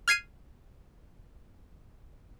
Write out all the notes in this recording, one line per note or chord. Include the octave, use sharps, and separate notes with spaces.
F6 G#6 C7 D#7